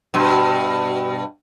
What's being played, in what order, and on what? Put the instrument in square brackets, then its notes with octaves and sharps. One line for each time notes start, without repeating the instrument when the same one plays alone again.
[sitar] G2 B2